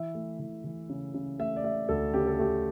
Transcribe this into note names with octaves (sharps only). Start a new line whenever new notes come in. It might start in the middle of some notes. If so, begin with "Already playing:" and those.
Already playing: E3 E5
A3
E3
E3
C#3
C#3
A3 E5
D5
A3 E5
D2 A4
C#3 G4
A4
A3 G4